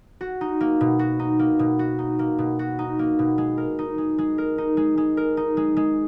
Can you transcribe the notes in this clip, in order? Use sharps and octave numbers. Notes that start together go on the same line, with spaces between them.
F#4
D#4
A#3
B2
F#4
D#4
A#3
B2
F#4
D#4
A#3
B2
F#4
D#4
A#3
B2
G#3
A#4
D#4
G#3
G#3
A#4
D#4
G#3
G#3
A#4
D#4
G#3
G#3